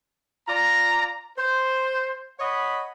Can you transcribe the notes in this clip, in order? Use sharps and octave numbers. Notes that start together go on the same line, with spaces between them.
F4 D5 A#5
C5
C#5 D#5 F#5 B5